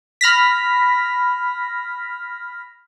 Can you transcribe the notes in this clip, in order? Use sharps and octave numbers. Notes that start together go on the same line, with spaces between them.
B5 F6 A#6 B6